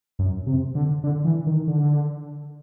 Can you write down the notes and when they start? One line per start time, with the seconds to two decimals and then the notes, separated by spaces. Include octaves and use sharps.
0.19 F#2
0.47 C3
0.75 D3
1.04 D3
1.24 E3
1.47 D#3
1.67 D3